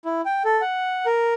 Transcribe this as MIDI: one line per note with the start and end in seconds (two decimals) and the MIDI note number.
0.05 0.21 64
0.25 0.43 79
0.45 0.61 69
0.61 1.06 78
1.06 1.34 70